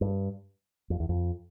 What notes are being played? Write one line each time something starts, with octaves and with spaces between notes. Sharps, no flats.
G2
F2
E2
F2